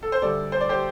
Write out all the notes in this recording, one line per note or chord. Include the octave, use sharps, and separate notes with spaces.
A4
C5
D2 D3 G3 A4 D5
C5
D5
G4 C5